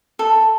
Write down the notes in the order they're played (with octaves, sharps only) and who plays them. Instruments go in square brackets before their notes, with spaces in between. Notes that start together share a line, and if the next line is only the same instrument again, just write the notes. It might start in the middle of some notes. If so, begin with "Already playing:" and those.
[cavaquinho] A4